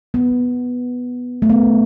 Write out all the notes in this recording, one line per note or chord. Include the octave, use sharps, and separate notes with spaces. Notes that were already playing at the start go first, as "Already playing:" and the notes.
B3
A3
B3